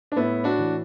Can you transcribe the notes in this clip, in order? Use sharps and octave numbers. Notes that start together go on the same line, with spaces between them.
D4
A2 B3 E4
D4 F#4
E3